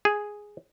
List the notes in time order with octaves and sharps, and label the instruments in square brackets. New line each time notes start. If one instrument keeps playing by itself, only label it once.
[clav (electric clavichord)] G#4